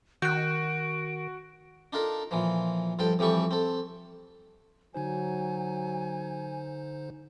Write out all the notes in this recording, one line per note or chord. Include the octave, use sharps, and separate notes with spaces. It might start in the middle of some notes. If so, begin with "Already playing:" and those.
D#3 F#4 F#6 G6 D7
D4 D#4 F4 A4 A#4
A#2 E3 F3
G2 F3 A4 G5
F2 E3 G3 G4 A4 C#6
C4 A4
D3 F#3 D#4 C5 G#5